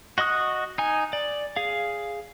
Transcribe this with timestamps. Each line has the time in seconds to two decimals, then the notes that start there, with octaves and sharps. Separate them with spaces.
0.18 F#4 D#5 C#6 D#6 F#6
0.78 D#4 G#5
1.13 D5
1.56 G#4 F5